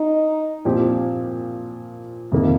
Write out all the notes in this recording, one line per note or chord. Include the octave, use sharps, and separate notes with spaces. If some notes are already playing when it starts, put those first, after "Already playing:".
Already playing: D#4
A#2 F3 C4 G4
F2 C3 D#3 A#3